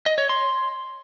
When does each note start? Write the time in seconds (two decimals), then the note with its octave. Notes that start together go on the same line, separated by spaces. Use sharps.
0.06 D#5
0.18 C#5
0.29 C6